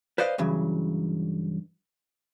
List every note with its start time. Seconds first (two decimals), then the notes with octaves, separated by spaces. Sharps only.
0.18 B4 C5 D5 D#5 F5
0.38 G2 C#3 E3 F#3